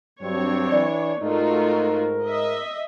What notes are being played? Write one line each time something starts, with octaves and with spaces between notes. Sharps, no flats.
G2 F#3 C4 D4 C#5
E3 D5
G#2 A3 D#4 F4 F#4 A#4
D#5 E5